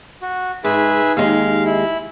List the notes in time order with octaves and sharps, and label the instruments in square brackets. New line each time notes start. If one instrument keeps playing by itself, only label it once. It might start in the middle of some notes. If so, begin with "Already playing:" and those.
[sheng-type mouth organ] F#4
[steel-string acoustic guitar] G#2 [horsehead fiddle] D#4 [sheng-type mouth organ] G#4 B4 E5
[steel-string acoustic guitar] D#2 G#3 [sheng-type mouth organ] F5
[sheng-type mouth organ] E4